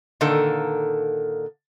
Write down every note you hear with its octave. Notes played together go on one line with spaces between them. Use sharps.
A#2 D3 D#3 A#3 A4